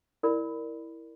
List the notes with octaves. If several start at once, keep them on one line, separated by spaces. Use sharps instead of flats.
E4 A#4 D5 B5